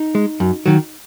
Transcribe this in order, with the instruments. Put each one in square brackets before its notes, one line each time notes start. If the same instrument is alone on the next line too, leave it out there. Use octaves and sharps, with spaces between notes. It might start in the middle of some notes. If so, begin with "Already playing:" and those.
Already playing: [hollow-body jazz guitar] D#4
G#3
F#2
D#3 F#3